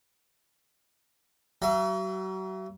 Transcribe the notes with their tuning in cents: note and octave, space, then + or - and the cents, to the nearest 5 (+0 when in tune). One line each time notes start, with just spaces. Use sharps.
F#3 +35 E5 +40